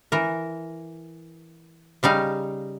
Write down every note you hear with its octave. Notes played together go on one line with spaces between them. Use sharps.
E3 A#4
C#3 G3 D#4 F5